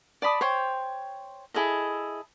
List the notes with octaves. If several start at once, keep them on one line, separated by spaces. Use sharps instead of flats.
D5 A5 B5 D#6
C5 C#5 G5
E4 G#4 A4 D#5